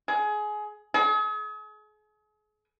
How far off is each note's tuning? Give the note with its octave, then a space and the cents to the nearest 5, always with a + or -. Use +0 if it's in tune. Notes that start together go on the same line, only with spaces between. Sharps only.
G#4 +20
G#4 +40